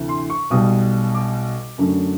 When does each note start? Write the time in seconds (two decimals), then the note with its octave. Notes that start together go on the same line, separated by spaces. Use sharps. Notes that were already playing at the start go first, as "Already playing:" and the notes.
Already playing: D2 C3 E3
0.09 C6
0.30 C#6
0.50 B1 B2 G3 B3 D#6
1.15 D6
1.78 F#2 D3 F#3 A3